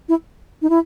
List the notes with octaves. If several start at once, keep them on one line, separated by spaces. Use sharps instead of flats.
E4
D#4
E4